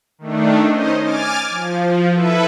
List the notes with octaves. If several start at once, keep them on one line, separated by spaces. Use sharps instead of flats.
D#3 A3 D4
C#4 D#4 C5 D#5
G#5 D6 F6 A6
F3
E4 A4 B4 E5